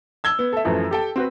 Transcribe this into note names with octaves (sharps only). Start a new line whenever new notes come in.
E6 G#6 G7
B3
A4 E5
F#2 E3 F3 A3
G4 A4 G5
C4 F#4 B4